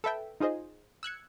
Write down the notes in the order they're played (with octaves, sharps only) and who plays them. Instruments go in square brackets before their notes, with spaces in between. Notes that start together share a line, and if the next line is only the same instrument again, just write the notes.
[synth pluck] A4 B4 E5 G5
D#4 F4 G#4 C5 D#5
E6 F#6 G#6 C#7